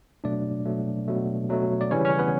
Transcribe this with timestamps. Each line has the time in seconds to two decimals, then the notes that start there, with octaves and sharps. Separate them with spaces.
0.24 B2 F#3 A3 D4 D5
0.66 B2 F#3 A3
1.07 B2 F#3 A3
1.50 B2 F#3 A3
1.81 D5
1.91 C#3 E3 G3 C#4 C#5
2.05 C#4 C#5
2.19 B3 B4